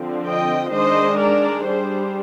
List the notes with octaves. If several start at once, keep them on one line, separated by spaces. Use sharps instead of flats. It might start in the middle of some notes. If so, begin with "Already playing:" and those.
Already playing: D3 F3 C4
D#5 G5
D#3 G#3 D4 C5 D#5
A#4 D5
G3 D4 G#4 C5